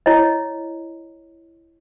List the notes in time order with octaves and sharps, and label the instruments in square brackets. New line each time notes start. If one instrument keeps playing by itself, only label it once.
[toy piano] E4 C#5 D#5